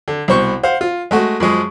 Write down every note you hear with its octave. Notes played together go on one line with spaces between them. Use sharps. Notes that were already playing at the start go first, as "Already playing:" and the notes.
D3
C2 B2 C5 C#6
C5 F5 F#5
F4
G#3 A3 F#4
F#2 F3 G#3 G#4